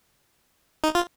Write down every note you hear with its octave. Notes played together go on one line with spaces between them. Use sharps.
D#4
F4